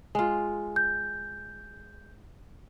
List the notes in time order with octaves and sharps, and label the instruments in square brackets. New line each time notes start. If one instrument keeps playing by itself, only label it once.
[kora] G#3 F4
[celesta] G6